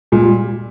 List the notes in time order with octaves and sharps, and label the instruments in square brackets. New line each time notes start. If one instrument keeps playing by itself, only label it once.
[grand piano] A#2 [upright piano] G#3
[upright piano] G3